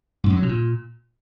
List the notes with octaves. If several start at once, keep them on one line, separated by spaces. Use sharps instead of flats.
G#2
F#2
F#3
B2
A#2